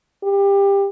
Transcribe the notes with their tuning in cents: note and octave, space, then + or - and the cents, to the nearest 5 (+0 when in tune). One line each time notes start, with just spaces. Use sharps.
G4 +20